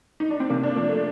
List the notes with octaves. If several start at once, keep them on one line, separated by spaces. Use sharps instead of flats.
D#4
D4
C4
C3 A#3
D4
F3 A#3
A3